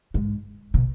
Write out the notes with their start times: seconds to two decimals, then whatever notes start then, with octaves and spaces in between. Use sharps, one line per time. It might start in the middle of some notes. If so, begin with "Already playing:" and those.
0.14 G#2
0.74 B2